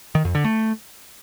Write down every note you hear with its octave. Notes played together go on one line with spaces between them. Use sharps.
D#3
F2
D3
A3